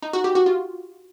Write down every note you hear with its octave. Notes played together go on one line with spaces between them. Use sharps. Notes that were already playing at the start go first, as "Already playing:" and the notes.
D#4
F#4
G4
F#4
F4